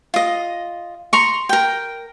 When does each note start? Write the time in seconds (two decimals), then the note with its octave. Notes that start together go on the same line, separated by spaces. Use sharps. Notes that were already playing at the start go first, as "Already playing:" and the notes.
0.14 F4 D#5
1.13 A#5 C6 C#6
1.49 A#4 G5